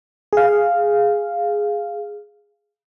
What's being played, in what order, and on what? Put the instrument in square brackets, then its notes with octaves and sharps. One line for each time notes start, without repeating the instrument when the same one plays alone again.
[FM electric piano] G#4 F5